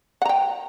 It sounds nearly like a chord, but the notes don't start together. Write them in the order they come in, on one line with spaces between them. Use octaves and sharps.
F#5 A#5 G5